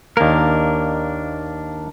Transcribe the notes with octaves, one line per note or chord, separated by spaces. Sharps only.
D#2 A#3 D4 A#4